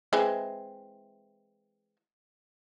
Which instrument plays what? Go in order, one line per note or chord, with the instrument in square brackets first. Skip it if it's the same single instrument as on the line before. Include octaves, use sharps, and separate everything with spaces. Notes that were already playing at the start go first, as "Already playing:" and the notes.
[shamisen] E3 G#3 C4